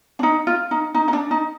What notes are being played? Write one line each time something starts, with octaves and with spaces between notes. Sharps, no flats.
D4
D#4
F4
D#4
D#4
D#4
D4
D#4